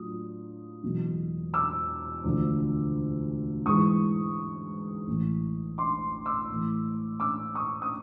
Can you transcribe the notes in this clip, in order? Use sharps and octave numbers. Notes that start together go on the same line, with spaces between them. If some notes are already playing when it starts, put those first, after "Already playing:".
Already playing: A2 F#3 A3 D4 F4 D#6
E1 E2 B2 F#3
D6 E6
E1 D2 D3 F3 A3
G#2 E3 G#3 C#6 D#6
A1 A2 E3
C6 D6
D6 E6
A2 E3 A3
D6 E6
C#6 D#6
D#6